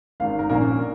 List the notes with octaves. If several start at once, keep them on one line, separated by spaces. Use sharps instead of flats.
G#1 G#2 D#3 F5
A#4
A#1 A#2 A#3 C#4 A#4